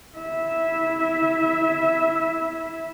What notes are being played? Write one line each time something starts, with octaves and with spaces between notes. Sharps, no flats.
E4 E5